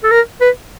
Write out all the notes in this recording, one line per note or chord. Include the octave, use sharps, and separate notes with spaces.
A4
A#4
B4